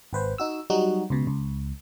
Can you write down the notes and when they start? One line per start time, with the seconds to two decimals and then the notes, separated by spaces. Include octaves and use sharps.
0.13 G#1 B4 C5
0.38 D#4 F#4 E6
0.70 F#3 G3 D#4 F#4
1.10 C#2 B2
1.27 C#2